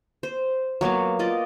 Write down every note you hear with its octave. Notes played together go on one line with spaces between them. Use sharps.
C5
F#3 A#3 B3 F5
F4 D5 D#5